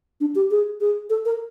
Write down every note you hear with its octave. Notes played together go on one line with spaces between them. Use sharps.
D4
G4
G#4
G#4
A4
A#4